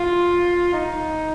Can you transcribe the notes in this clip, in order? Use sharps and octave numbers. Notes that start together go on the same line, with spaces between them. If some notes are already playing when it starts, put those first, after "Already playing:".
Already playing: F4
D#4